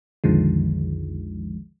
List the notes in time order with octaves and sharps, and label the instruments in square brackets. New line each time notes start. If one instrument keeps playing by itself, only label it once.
[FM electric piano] B1 F2 D3 D#3 F3 G#3